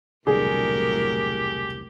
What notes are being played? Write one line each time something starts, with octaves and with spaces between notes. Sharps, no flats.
E1 C2 A2 D3 F#3 G4 G#4 A#4